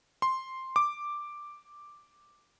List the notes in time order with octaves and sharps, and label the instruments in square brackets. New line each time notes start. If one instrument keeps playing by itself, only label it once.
[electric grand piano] C6
D6